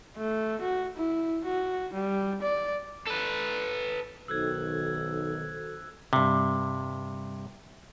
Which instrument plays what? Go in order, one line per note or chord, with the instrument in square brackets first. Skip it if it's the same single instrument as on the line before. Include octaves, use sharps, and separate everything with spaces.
[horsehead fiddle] A3
F#4
E4
F#4
G3
D5
[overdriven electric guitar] A4 B4
[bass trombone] B1 [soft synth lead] D#3 [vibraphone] F#4 A4 C5 [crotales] E6 F#6 G#6
[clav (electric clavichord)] G2 C3